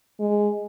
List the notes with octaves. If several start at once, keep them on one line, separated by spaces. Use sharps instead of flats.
G#3